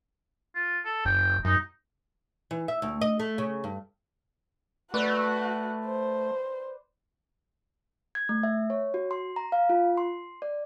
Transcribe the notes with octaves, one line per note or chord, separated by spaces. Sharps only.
F4
A4
F#1 G5
F#2 D#4
E3
E5
D2
D#5
A3
C#3
G2
A3 F#4 B4 D5 F#5
C5
G#6
A3
E5
C#5
F#4
C6
A#5
F5
F4
C6
D5